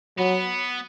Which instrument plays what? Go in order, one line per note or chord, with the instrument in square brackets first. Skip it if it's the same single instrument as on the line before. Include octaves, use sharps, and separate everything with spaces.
[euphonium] F#3 [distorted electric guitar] B3